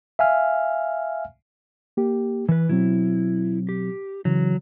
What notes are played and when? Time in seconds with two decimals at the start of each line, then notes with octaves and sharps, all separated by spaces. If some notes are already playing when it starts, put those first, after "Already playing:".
0.19 E5 F5 G#5 F6
1.97 A#3 G4
2.49 E3 B4
2.69 B2 F#3 C4 E4
3.69 G4
4.25 C#3 E3 F#3